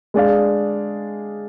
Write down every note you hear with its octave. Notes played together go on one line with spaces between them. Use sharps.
G#3 D4 G#4 D5 F5